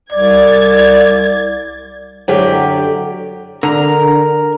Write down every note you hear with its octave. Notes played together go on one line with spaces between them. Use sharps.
C2 D5 G#6 A6
F#2 D3 F#3 G4 D5
D3 A#4 A#5